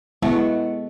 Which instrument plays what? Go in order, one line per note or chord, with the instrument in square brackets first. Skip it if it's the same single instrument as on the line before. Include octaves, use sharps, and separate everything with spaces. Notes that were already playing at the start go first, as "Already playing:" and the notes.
[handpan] G#3 B3 [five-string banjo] A3 F#4 [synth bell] E4 C#7